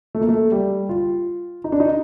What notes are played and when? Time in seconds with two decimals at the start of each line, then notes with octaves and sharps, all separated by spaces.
0.15 A3
0.21 A#3
0.28 A3
0.52 G3
0.89 F4
1.64 D#4
1.72 D4
1.80 D#4